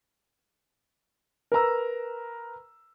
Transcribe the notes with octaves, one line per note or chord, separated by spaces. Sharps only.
A#4 B4 A#5 E6